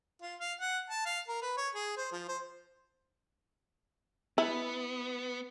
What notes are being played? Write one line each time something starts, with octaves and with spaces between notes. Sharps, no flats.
F4
F5
F#5
A5
F5
A#4
B4
C#5
G#4
C5
F3
C5
B3 E4